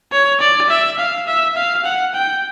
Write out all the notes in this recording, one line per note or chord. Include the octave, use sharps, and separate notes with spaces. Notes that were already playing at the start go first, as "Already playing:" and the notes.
C#5
D5
E5
F5
E5
F5
F#5
G5